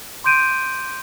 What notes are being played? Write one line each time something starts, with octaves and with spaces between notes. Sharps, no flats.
C6 D6 G6 D7 D#7